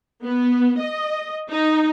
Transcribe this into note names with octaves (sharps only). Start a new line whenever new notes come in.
B3
D#5
D#4